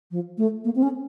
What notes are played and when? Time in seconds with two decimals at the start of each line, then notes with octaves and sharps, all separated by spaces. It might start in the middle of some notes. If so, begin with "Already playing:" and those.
0.11 F3
0.38 A3
0.64 A#3
0.75 C4
0.82 C#4